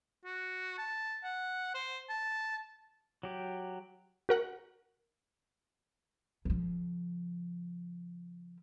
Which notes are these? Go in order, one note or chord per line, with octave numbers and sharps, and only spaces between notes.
F#4
A5
F#5
C5
A5
F#3 G4
F#4 A#4 F#5
C#3 F3